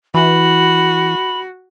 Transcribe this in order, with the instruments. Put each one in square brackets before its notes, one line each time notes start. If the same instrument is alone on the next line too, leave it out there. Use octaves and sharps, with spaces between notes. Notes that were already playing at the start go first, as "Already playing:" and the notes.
[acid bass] E3 [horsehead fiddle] F#4 [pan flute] B5